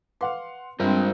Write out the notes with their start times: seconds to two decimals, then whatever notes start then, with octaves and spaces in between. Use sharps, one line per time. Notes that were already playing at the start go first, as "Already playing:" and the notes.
0.21 B4 F5 F#5 C6 D6
0.80 G2 G3 G#3 C4 F4 A#4 C5